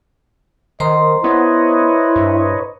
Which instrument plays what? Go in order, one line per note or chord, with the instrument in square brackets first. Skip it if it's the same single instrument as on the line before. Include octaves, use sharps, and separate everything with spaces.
[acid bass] D#3 [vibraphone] C5 A#5 C6 [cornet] D#5
[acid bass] B3 [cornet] E4 [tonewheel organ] B4 C#5 D#5
[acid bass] G2